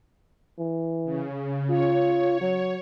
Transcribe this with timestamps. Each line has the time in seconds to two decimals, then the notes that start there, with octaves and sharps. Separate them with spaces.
0.59 E3
1.05 C#3
1.70 F4 C#5
2.41 F#3